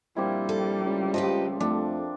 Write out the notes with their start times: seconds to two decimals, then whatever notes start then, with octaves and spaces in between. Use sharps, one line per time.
0.16 A#1 G3 A#3 C4 E4
0.49 A4
0.84 C#2
1.14 F3 G4 B4 D#5
1.60 F2 A3 D4